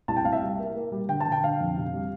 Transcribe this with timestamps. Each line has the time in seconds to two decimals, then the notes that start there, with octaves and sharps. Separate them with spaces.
0.08 C2 A5
0.16 G5
0.25 C2 F5
0.33 E5
0.42 G3
0.59 A#3
0.76 A#3
0.92 G3
1.09 D3 G5
1.20 A5
1.27 D3
1.32 G5
1.44 D3 F5
1.60 F2
1.77 C3
1.94 G3